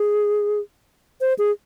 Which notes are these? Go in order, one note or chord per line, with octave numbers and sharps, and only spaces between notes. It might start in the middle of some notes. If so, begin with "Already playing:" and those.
Already playing: G#4
C5
G#4